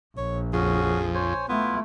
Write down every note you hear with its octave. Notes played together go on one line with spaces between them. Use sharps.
A#1 C#5
F2 C#4 F#4 G#4
C5 C#5 G#5
A3 B3 E4 F4